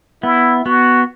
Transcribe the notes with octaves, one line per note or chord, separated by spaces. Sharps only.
B3 E4
B3 F#4